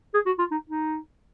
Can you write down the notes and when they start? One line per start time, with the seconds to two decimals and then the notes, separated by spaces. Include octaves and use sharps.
0.14 G#4
0.26 F#4
0.39 F4
0.51 D#4
0.69 D#4